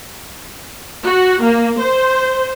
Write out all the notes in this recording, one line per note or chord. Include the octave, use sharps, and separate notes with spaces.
F#4
A#3
C5